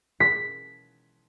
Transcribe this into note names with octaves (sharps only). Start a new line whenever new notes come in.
B6